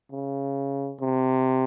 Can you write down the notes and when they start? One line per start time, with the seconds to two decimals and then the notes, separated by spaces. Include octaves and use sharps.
0.11 C#3
1.00 C3